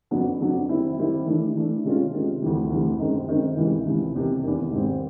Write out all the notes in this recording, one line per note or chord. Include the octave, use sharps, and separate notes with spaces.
F2 C#3 F#3 B3 D4
F2 C#3 F#3 B3 D4
D#3 G3 C4 E4
D#3 G3 C4 E4
E3 A3 D4
E3 A3 D4
C3 D#3 G#3 C#4 F4
C3 D#3 G#3 C#4 F4
D2 C3 E3 G3
D2 C3 E3 G3
F#2 D#3 G#3 C4 D#4
F#2 D#3 G#3 C4 D#4
C#2 C3 E3
C#2 C3 E3
E2 C3 D#3
E2 C3 D#3
G#2 D#3 G3 C4